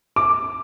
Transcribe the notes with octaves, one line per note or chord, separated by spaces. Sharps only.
D6